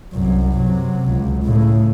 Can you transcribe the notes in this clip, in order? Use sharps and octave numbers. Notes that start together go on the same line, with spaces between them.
C2 F#2
C3 F#3
C#2
A2 C#3